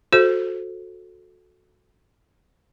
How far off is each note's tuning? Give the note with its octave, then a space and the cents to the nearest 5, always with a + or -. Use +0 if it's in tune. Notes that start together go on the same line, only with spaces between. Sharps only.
F#4 -20 A4 -10 C5 +5